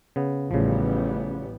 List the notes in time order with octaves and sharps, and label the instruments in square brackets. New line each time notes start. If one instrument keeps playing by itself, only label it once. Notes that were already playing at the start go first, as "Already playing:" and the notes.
[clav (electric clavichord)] C#3 B3
[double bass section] A1 G3 B3 [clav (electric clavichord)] C#3 F3